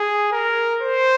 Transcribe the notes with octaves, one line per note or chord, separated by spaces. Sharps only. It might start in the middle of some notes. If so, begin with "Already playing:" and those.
Already playing: G#4
A#4
C5